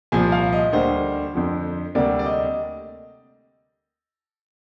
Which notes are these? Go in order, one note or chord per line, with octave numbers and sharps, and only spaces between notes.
C2 A#2 F3 G#5
F5
D#5
D2 D3 G3 A#3 C5
F2 D3 F3
D2 C3 G3 A#3 D5
D5
D#5